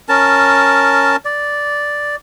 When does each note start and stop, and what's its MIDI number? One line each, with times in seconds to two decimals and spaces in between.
0.09 1.16 61
0.09 1.16 70
0.09 1.16 81
1.25 2.16 74